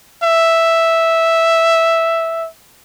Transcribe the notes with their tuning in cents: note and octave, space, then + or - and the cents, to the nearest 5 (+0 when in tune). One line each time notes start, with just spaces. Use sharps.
E5 +0